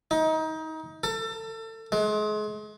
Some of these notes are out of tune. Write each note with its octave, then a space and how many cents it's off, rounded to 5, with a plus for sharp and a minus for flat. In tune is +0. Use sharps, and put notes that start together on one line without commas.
D#4 +25
A4 +30
G#3 +35